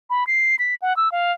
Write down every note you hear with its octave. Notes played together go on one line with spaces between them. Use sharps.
B5
C7
B6
F#5
E6
F5